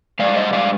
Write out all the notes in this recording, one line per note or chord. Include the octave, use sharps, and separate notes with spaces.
G#2 G3 D5 F5
C5 D#5
D5 F5